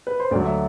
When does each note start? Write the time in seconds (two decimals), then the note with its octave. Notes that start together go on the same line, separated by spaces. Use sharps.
0.07 B4
0.20 C5
0.31 D2 D3 F#3 A3 D5
0.46 E5